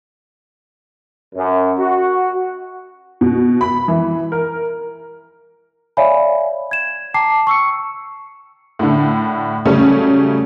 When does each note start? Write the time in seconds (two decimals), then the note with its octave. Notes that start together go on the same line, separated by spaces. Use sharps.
1.35 F#2
1.79 F#4
3.21 B2
3.61 B5
3.88 E3
4.32 A#4
5.97 C#5 D5 E5 F5 G#5 B5
6.71 G#6 E7
7.14 G5 A5 A#5 D6 C7
7.47 C#6 E6 C#7
8.79 A2 D3
9.66 C#3 F#3 G3 A3 C#4